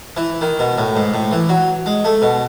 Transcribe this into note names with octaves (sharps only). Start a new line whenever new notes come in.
E3
D#3
B2
A2
G#2
A2
E3
F#3
G#3
A3
B2